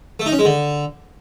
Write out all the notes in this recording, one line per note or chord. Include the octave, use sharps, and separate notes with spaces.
A3
D#4
C#4
G#3
D3